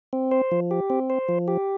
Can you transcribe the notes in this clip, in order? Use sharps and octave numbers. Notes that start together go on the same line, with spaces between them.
C4
C5
F3
G4
C4
C5
F3
G4